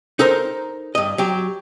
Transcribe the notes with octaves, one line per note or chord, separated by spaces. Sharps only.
D#4 A4 A#4 C5
G2 D#5
F#3 G4